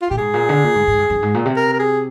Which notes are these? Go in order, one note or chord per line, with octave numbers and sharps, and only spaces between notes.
F4
A#2 G4
G#2 G#4
A#2
D3
A#2
G#2
G#2
G2
G2
G#2
A#2
C3
A#4
A#4
G#4